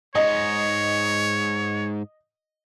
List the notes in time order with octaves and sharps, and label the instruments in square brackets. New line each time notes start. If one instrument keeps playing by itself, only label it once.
[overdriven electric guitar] G#2 [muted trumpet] C#5 [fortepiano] D#5